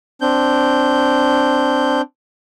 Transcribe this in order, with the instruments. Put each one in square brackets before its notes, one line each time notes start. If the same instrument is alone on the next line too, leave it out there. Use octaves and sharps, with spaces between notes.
[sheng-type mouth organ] C4 D4 G6